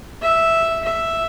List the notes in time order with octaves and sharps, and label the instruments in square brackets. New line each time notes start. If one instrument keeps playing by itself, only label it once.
[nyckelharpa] E5
E5